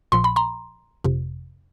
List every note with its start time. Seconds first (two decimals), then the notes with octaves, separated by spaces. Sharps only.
0.12 A#1 A#2 F3 C6
0.24 B5
0.36 A#5 C6
1.04 G1 F2 C3